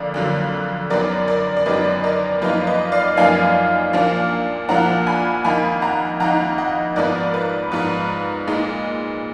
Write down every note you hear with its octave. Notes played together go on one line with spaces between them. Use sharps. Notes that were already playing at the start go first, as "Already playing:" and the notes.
Already playing: F2 D3 A#3 D5
F2 D3 F#3 A#3
F#2 D#3 F#3 B3 A#4 D5
A#4 D5
D5
F#2 D#3 F#3 B3 B4 D#5
A#4 D5
F#2 F3 A#3 D#4 B4
B4 D#5
D5 F5
F#2 F3 A#3 D#4 F5 G#5
A#2 F3 A#3 D4
A#2 F3 A#3 D4 F#5 A#5
G#5 B5
F2 D#3 A#3 D#4 G#5 B5
F#5 A#5
F2 D#3 A#3 D#4 F#5 A#5
D#5 F#5
G#2 F3 B3 A#4 D5
B4
G#2 F3 B3 B4
A#2 G#3 D#4